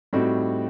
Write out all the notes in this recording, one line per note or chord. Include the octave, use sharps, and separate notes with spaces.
A2 G3 C4 D#4 F#4